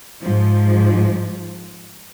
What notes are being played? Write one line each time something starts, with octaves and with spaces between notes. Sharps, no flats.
G#2 F3